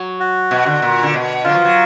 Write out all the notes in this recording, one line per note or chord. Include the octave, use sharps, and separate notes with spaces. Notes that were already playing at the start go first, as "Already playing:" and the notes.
Already playing: F#3
F#4
B2
D3
A#2
D3
B2
D3 F#3 F4
F3
F#3